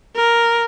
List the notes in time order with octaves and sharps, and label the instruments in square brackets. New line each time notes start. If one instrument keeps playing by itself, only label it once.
[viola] A#4